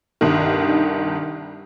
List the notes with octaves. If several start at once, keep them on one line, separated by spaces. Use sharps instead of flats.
G1 C2 G2 D#3